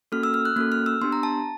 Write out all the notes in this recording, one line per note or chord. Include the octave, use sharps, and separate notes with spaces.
A#3 C#4 F#4 A4 F6
E6
F6
F#6
A#3 C#4 F#4 A4 F#6
F6
E6
B3 D4 G4 C6
A#5
A5